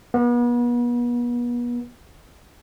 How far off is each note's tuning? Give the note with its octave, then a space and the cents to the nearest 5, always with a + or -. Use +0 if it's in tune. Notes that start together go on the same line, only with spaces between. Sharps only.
B3 -40